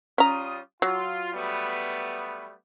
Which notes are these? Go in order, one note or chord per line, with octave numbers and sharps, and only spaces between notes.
G3 C#4 F4 A#5 D#6
F#3 F4
G3 A3 B3